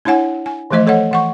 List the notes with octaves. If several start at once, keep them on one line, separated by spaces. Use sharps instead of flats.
D4 E4 C#5 F#5 G#5
G#5
E3 F3 A3 C5 D#5
A4 C#5 D#5 F#5
E3 F#5 C#6